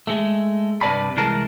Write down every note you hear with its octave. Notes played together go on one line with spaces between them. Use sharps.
G#3 A3
G2 C3 B4 D5 A5 B5
C2 E3 G#3 A#4 A5